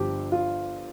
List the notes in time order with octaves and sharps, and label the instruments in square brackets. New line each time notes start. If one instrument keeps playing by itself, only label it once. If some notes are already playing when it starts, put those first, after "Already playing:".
Already playing: [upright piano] G1 G2 F3 G4
F4